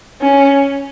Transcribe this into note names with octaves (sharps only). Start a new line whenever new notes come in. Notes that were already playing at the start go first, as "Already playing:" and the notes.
C#4